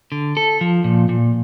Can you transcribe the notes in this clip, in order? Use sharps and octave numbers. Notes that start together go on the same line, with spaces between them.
D3
A4
F3
A#2
A#2